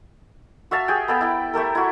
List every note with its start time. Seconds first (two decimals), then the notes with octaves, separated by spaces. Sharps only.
0.71 F#4 E5 F5 A5
0.88 G4 G#4 G5
1.08 B3 A4 F5 G5
1.21 E4 G5
1.53 A3 G4 A4 A#4
1.75 E4 F#4